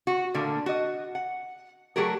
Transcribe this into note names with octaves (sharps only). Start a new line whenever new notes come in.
F#4
A#2 D3 A3 A#3
F#4 D#5
F#5
F#3 A3 G4 G#4 A#4